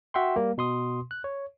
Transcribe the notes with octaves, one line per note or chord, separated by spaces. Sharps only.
F#4 E5 F#5 G5 C6
G3 A#3
B2 C6 D#6
F#6
C#5